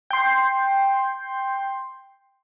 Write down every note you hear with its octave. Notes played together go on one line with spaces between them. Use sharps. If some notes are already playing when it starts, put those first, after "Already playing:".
G5 C6